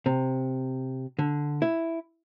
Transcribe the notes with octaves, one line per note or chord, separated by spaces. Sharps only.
C3
D3
E4